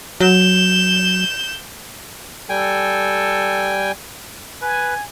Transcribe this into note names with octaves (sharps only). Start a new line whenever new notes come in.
F#3 G6 E7
G3 A4 G5 G#5
B4 G#5